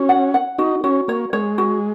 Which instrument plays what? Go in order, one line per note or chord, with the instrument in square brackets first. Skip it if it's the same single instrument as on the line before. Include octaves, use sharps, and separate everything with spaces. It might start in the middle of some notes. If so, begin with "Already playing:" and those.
Already playing: [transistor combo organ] C#4 [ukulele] F#4
[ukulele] F#5
F#5
[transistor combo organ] D#4 [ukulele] F#4
[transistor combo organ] C#4 [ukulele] F#4
[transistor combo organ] A#3 [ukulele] C#5
[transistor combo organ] G#3 [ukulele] C#5
[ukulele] F#4